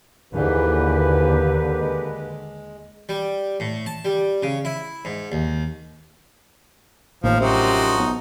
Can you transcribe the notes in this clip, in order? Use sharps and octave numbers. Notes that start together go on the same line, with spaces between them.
D#2 G#2 D3 E3 A#3 G4 B4
G#3
G3
A2
A5
G3
C#3
E4
G#2
D#2
A1 D#2 F3
F#2 C3 F3 D#4 F#4
B1